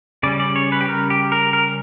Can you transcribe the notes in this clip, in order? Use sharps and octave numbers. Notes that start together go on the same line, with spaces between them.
C#3 G3 C#4 D5
D5
C#5
B4
G4
A#4
G4
A#4
A#4